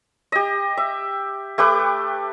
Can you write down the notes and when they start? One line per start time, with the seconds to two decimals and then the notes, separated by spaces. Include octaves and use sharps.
0.32 G4 D#5
0.77 E5
1.58 A3 G4 B4 D6